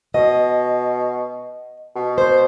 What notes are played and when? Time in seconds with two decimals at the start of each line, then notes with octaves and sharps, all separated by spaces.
0.14 B2 D#5
1.96 B2
2.18 C5